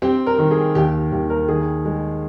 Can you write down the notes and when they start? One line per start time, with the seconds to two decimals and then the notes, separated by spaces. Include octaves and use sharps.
0.02 C4 G4
0.26 A#4
0.38 D#3
0.51 G#4
0.75 D#2 G4
1.12 D#2 G4
1.30 A#4
1.48 D#3 G#4
1.85 G#3